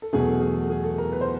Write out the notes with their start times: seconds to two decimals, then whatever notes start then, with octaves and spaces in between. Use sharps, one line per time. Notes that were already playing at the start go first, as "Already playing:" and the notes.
0.02 A4
0.13 E2 B2 F#3 A3 G#4
0.42 G#4
0.70 G#4
0.84 A4
0.98 A#4
1.13 B4
1.21 C5